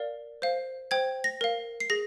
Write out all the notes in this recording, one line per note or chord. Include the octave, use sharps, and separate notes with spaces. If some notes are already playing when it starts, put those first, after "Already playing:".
Already playing: A#4 D5 F5
C5 F5
C5 G5 G#6
A#6
A#4 F5
C7
G#4 A#6